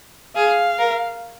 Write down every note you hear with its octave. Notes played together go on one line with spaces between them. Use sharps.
G#4 F5
A#4